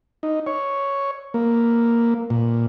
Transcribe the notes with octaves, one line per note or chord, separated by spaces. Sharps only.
D#4
C#5
A#3
A#2